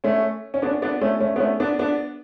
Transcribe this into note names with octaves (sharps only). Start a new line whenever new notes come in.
A3 C#4
C#4
B3 D4
B3 D4
A3 C#4
A3 C#4
B3
A3 C#4
B3 D4
B3 D4